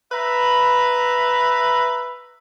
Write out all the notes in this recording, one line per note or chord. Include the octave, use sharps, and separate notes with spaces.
B4 E5 A#5 B5